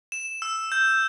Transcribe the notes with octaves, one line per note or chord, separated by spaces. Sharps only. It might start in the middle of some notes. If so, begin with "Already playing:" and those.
E7
E6
G6